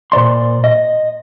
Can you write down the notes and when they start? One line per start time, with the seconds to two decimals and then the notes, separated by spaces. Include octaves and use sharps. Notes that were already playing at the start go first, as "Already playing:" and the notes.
0.12 A#2 C5 D5 C6
0.64 D#5